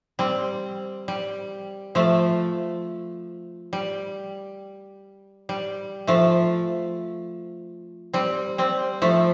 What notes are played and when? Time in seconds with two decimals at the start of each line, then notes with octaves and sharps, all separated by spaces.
0.19 G3 C4
1.08 G3
1.95 F3 A3
3.73 G3
5.49 G3
6.07 F3 A3
8.14 G3 C4
8.58 G3 C4
9.02 F3 A3